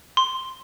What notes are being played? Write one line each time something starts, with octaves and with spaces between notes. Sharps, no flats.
C6